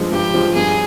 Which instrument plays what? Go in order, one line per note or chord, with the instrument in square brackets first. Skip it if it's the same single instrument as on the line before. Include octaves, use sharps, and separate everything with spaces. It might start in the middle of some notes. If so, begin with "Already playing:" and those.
Already playing: [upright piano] G2 F3 G#3
[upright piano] G2 [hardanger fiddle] G4
[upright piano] F3 G#3
[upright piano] G2 [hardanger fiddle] G#4